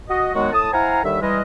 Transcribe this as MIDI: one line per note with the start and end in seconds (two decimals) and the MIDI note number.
0.09 0.31 66
0.09 0.31 75
0.34 0.53 51
0.34 0.53 54
0.34 0.53 56
0.34 0.53 59
0.34 0.53 66
0.53 0.69 45
0.53 0.69 81
0.53 0.69 87
0.73 1.03 64
0.73 1.03 72
0.73 1.03 77
0.73 1.03 78
0.73 1.03 80
0.73 1.03 82
1.04 1.18 39
1.04 1.18 50
1.04 1.18 51
1.04 1.18 55
1.04 1.18 76
1.21 1.41 52
1.21 1.41 55
1.21 1.41 56
1.21 1.41 75